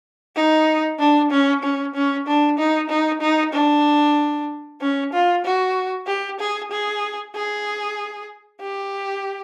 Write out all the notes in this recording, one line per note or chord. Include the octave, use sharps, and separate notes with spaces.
D#4
D4
C#4
C#4
C#4
D4
D#4
D#4
D#4
D4
C#4
F4
F#4
G4
G#4
G#4
G#4
G4